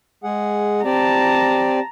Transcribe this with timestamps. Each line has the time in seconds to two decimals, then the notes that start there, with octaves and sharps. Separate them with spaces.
0.24 G#3 G#4 F#5
0.85 C4 G4 D5 A5 A#5